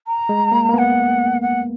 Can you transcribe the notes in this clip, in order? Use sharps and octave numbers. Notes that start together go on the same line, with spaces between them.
A#5
G#3
A#3
A#3
B3 F#5 A#5
F#5